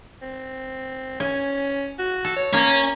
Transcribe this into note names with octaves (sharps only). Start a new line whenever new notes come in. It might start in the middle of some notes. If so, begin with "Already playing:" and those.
C4
C#4 G#5
F#4
A4
C#5
A#3 C#4